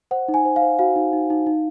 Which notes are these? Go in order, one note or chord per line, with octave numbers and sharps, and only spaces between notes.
C5 F#5
D#4
G#5
C5
F5
C5
F#4 F5
D#4
D#4
D#4
D#4